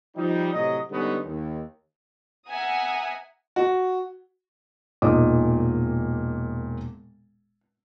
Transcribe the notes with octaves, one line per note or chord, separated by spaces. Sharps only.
F3 G3 D#4
A2 C3 F#3 D#5
D3 G3 G#3 B3 C#4 D#4
D#2
E5 F#5 G#5 A#5 D#6
F#4
E1 A#2 D#4 D6 D#6